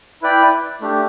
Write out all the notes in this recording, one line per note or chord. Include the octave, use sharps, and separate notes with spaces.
E4 B4 D5 G5
A3 D4 G4